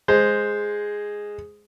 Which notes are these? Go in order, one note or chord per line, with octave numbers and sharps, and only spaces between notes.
G#3 C5